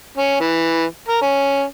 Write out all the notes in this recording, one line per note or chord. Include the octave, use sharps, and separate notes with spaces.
C#4
E3
A#4
C#4